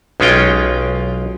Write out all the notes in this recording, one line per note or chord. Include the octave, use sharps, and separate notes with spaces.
B1 G#3 C#4 F4 G5